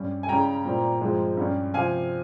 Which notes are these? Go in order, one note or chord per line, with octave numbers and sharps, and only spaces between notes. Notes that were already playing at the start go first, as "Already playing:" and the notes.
Already playing: G2 G3 C#4
G#5
C#3 G3 C#4 G5 A#5
A#2 G3 C4
G2 F3 G#3 C4
G2 G3 C#4
C3 F3 C4 F5 G#5